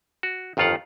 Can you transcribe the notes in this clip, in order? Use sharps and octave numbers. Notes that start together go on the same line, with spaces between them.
F#4
G1 F2 D#3 F4 F5 F#5